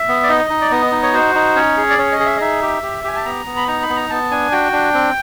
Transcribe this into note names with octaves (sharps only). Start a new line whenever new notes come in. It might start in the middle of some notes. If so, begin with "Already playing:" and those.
Already playing: E5
B3
D5
D#4 D#5
D#4
D5
B3 D#5
D#4
C#5
F#4 C5
D#4
C#4 C#5
G#4
D5
C#4 C#5
D#5
G#4
E5
D#5
D#4 E5
G4
G4
G4 G#5
A5
B3 A#5
B3
B5
D#4 A#5
B5
B3
A#5
B3 A5
D4 G#5
F#4 G5
D4
C4